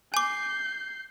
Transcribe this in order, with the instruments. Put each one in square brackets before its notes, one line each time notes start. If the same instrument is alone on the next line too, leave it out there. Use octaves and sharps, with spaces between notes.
[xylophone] G#5 D6 [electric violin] G6 C7